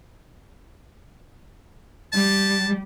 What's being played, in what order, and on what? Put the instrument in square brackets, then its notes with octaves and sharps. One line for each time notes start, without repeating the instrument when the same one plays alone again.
[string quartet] G3 [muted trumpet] A5